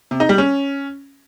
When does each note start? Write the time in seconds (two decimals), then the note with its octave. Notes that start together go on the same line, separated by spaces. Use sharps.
0.11 C3
0.20 D#4
0.29 G3
0.38 C#4